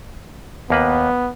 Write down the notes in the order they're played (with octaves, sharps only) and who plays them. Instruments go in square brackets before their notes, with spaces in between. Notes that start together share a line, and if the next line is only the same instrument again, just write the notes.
[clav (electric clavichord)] D#2 A#3 B4 [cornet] B3